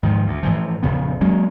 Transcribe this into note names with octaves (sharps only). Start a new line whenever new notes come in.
G#2 D#3 F3
D2
A2 E3 F3
A#1 F2 C#3 B3
F#3 G#3 A#3 C#4